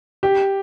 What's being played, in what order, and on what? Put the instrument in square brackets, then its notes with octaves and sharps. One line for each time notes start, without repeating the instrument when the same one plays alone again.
[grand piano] G4